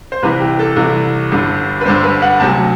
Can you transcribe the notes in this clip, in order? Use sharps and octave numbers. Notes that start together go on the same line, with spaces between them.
C5
C2 C3 E3 B4
G4
A4
C2 C3 E3
G1 G2 D3
B4
G1 G2 D3 C5
B4
F#5
D2 C3 F#3 A5